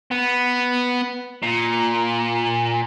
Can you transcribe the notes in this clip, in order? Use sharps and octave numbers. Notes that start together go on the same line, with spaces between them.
B3
A#2